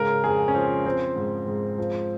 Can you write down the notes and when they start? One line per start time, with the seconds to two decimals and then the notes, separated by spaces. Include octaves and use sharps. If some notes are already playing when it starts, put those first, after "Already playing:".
Already playing: G#2 C#3 A#4
0.24 F2 G#4
0.48 C#4
0.54 F3 C4
0.86 F3 C4
1.16 G#2
1.47 G#2
1.78 F3